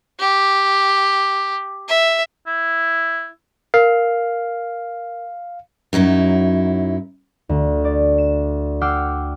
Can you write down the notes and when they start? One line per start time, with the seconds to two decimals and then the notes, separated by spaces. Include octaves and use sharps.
0.20 G4
1.88 E5
2.47 E4
3.74 A#4 F5
5.93 F#2 F#3 D#4 E4
7.49 D2
7.84 D5
8.18 E7
8.81 F#5 G5 D6 E6 F6 C7